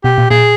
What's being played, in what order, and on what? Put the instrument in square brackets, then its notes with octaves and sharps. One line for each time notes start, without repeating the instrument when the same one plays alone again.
[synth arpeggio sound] B2 [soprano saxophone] G4
[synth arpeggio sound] A#2
[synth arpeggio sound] A#2 [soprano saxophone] G#4